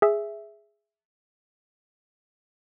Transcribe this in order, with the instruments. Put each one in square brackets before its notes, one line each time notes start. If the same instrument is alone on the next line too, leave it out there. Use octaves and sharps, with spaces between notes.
[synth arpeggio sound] G#4 E5